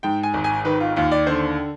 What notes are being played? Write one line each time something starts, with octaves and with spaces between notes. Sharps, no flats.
G#2 G5
G#5
G#1
G#5
D#3 B4
F4
D#2 F4
D5
D3 C5